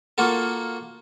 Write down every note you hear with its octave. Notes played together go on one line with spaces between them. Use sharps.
A#3 F4 F#4 A4